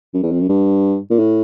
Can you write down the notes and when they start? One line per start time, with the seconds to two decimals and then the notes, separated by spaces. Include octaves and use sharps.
0.14 F#2
0.23 E2
0.31 F2
0.41 F#2
0.49 G2
1.10 A#2
1.19 A2